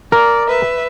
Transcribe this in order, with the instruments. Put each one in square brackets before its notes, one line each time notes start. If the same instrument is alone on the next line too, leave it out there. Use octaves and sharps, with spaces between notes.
[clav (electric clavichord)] A#4 [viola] D5
[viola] B4 E5